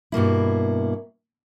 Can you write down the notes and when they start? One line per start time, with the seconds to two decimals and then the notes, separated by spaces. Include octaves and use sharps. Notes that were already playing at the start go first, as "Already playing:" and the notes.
0.12 G2 B2 A#3 E4